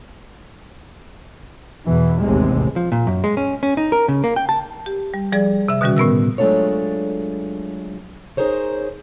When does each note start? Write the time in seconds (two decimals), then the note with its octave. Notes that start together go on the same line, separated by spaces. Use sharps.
1.88 E2 B2 E3
2.21 A1 D#2 A2 C3 G#3
2.76 F3
2.92 A#2
3.07 F#2
3.24 G#3
3.37 C#4
3.63 C#4
3.77 D#4
3.92 A#4
4.08 C#3
4.24 A#3
4.36 G5
4.49 A5
4.86 G4
5.14 G3
5.32 F3 G3 G#4 D5
5.68 C3 E5
5.81 B2 D3 D#3 G3 C#4 F#4
5.96 A2 B3 A#4 E6
6.38 F#3 G#3 A3 D4 F4 C#5
8.37 D#4 G#4 A#4 C5 C#5